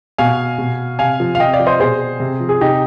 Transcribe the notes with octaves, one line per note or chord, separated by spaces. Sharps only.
B2 F5 G#5
B2
C3 F5 G#5
F3
F5
C3 D#5 G5
D5 F5
F3
C5 D#5
B2 G#4 C5
C3
F3
G#4
C3 D#4 G4